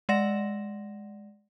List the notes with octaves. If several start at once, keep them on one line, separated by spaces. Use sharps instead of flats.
G#3 D5 F#5 A#6 E7